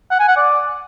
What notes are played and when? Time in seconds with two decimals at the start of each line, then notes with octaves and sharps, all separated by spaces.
0.11 F#5
0.19 G#5
0.28 F#5
0.37 D5